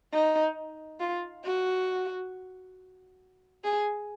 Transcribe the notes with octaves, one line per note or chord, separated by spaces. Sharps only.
D#4
F4
F#4
G#4